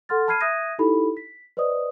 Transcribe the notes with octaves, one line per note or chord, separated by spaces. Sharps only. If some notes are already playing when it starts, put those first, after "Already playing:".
A4 F#5 C6 F6 A6
A5 B5 F6 G#6 C7 D#7
E5 D#6 F#6 G#6 A#6 D#7
D#4 E4 G4 A4 B5
B6
B4 C5 D5 D#5 D#6